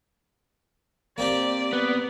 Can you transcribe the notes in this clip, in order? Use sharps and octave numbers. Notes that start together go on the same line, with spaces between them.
A#3 C4 G4 D5
B3